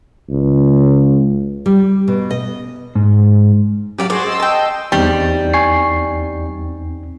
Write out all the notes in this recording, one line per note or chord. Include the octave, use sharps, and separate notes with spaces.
C#2
G3
B2
D#5
G#2
F#3 G4 D5 F5
F#4 G#4 C5 D5
D#5 C6 E6
G5 A5
E2 G3 C4 D#4
G#5 C#6 C7